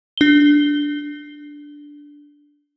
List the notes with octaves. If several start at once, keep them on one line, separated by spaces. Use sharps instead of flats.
D4 G7